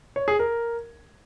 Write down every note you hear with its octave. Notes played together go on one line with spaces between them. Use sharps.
C#5
G#4
A#4